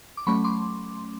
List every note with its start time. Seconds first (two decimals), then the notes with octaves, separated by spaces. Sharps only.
0.17 D6
0.27 F#3 A3 C#4 B5 C#6
0.44 C6 D6